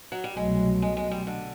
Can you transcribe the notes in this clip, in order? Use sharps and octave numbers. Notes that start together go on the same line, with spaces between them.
F#3
G3
C2 B2 F#3 G#3 A3
G#3
G#3
G3
D3